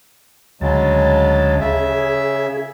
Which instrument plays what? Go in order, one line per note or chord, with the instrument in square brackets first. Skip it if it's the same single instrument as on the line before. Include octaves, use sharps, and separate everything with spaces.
[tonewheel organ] D2 A5 [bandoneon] C#3 F#3 G#3
[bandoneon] C#3 E5 [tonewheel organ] G#4